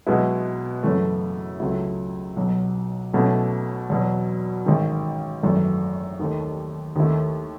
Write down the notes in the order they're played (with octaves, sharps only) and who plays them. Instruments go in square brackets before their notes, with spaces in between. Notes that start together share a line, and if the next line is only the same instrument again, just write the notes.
[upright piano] B1 B2 G#3 B3 E4
F#2 C#3 E3 A3
C#2 C#3 F#3 A3 E4
B1 B2 F#3
B1 B2 A3 C#4 E4
E2 B2 F#3
A1 G#2 D#3
G#1 F#2 E3 A3
D#2 D#3 A3
D#2 D#3 A3 E4